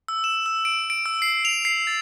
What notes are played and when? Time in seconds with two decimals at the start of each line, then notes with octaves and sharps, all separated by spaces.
0.08 E6
0.24 E7
0.46 E6
0.65 D7
0.90 D7
1.06 E6
1.22 C7
1.45 F7
1.65 C7
1.87 A6